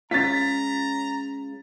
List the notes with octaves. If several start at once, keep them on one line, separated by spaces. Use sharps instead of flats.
G#3 C#4 F4 A#5 A6 B6